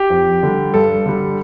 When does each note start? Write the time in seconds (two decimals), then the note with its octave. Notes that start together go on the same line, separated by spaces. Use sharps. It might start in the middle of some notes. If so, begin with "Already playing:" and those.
Already playing: G4
0.10 F2
0.43 D3 G3
0.74 G2 A4
1.06 D3 G3